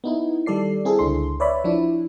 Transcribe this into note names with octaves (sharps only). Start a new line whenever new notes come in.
B3 D#4 E4
D#3 G3 A4 D5 C7
C4 E4 G#4 A4
C#2 D3 D4 C6
B4 C#5 D5 E5 B5
F3 D4 E4